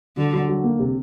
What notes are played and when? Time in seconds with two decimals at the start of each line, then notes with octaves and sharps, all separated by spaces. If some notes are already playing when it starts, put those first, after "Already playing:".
0.17 D3 F#3
0.33 F#3
0.49 F#3
0.64 A#3
0.79 C3